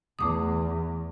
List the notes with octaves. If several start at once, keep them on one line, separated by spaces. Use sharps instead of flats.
E2 A3 D6 D#6